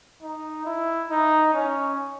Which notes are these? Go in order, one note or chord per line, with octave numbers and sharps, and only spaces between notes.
D#4
E4
D#4
C#4